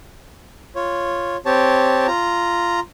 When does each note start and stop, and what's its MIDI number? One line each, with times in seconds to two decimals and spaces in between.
0.75 1.37 65
0.75 1.37 73
1.46 2.07 60
1.46 2.07 67
1.46 2.07 73
1.46 2.07 81
2.07 2.80 65
2.07 2.80 82